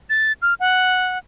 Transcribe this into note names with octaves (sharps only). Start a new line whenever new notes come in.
A6
F6
F#5